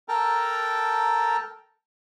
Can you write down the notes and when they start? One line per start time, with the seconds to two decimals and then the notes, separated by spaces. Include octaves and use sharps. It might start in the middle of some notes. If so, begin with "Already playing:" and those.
0.08 A4 A#4 G5 A5 A#5